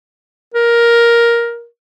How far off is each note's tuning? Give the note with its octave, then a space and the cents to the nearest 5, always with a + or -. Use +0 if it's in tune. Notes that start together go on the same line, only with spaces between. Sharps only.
A#4 +10